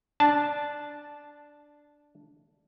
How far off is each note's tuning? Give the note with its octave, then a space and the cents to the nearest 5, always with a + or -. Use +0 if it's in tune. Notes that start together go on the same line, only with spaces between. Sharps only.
D4 +0 A5 -10